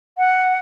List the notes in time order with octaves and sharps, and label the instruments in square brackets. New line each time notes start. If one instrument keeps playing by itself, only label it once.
[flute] F#5